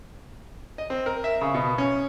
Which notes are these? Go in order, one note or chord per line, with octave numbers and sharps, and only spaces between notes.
D#5
C4
A#4
E5
C#3
B2
C#4